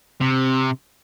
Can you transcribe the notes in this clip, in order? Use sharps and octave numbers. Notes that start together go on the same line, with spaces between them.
C3